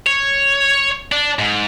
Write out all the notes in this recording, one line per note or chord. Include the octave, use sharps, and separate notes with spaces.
C#5
D4
G#2